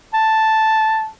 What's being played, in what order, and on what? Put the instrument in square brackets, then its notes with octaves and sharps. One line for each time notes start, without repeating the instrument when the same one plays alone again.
[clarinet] A5